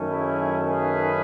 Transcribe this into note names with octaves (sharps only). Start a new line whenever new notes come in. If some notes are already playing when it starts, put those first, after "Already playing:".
Already playing: F#2 D#3 A3 C#4
E4 G#4
G#4 B4